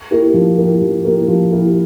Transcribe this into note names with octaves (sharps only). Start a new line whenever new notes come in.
A#3 E4 G4 A#4
F3
A#3 E4 G4 A#4
F3
A#3 E4 G4 A#4
F3
A#3 E4 G4 A#4